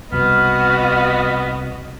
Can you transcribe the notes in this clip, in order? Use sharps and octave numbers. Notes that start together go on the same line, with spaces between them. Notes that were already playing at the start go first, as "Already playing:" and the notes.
C2 B2 B3 F#4 D#5 F6